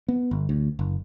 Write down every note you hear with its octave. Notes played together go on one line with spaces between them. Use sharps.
B3
G1
D2
F#1